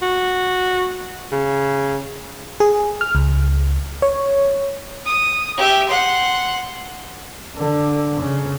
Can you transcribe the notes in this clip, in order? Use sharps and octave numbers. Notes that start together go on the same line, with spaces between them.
F#4
C#3
G#4
F6
C#2
C#5
D#6
G4 E5
F#5 C6
D3
C#3